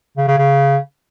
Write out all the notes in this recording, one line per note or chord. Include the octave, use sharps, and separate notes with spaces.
C#3
C#3
C#3